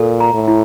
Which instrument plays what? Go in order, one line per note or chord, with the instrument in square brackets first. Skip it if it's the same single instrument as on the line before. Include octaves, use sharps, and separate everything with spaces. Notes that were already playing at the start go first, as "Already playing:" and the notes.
Already playing: [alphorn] A#2 [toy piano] A4
[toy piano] A#5
[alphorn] A2
[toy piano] E4